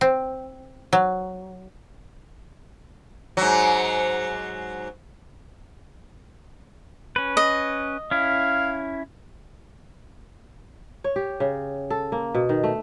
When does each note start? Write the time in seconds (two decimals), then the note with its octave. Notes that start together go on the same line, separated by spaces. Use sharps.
0.01 C4
0.93 F#3
3.37 G#2 F#3
7.16 C#4 B4
7.37 D#5
8.11 C#4 E4 F5
11.04 C#5
11.16 G4
11.40 C#3
11.90 A4
12.12 A#3
12.35 B2
12.49 D#3
12.63 A3